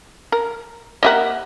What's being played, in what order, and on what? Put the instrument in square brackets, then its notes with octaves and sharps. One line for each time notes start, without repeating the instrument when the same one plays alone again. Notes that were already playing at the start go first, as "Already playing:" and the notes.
[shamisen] A#4
[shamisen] A#3 G4 A#4 [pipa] D#5 E5 F#5